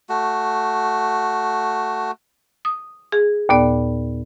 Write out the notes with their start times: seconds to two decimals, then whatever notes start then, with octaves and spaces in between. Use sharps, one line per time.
0.09 A3 F#4
2.65 D#6
3.12 G#4
3.49 D#2 A#2 B3 D5